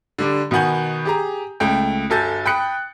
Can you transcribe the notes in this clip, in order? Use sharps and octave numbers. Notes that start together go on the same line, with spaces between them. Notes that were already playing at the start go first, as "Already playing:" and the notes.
D3 G3 D4
B2 D#3 B3 F#5 G#5 G6
G4 G#4 A#5
C#2 A3 G5
G1 F#4 A4 G#5 G6 A6
G5 B5 D#6 F#6 C#7